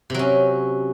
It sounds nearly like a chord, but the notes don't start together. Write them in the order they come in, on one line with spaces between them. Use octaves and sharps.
C3 F#3 C#4